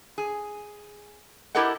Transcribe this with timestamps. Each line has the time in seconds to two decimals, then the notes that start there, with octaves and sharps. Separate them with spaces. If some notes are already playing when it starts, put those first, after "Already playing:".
0.18 G#4
1.55 E4 G4 A4 A#4 D#5 F#5